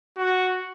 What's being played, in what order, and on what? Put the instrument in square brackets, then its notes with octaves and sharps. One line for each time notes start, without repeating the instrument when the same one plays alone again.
[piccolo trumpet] F#4